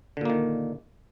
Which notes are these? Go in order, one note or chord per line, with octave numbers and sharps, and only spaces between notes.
A#2 D3 D#3 A#3